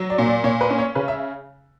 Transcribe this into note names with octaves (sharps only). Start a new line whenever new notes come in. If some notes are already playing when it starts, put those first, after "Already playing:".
Already playing: F#3
D5
A#2
D5
A#2 C#5
B4
C#4
C#5
C#3 B4
E5